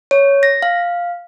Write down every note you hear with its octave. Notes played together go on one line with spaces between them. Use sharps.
C#5
A#6
F5